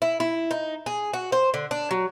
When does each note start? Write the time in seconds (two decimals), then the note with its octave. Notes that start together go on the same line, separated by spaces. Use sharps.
0.02 E4
0.20 E4
0.51 D#4
0.86 G#4
1.13 F#4
1.32 C5
1.54 D3
1.71 D4
1.91 F#3